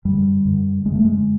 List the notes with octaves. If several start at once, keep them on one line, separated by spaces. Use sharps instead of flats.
F#2 D3 G3
F#2 D3
F#2 D3 G#3
A3
G#3